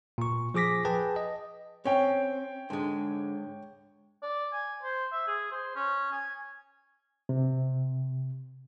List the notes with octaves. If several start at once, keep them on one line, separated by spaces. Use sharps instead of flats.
A#2 C#6
F3 G#4 D6 A#6 B6
G#4 B4 G5 A5
D#5
C4 C#4 C#5 G5
G#2 D3 G#3
D5
G#5
C5
E5
G#4
C5
C#4
G#5
C3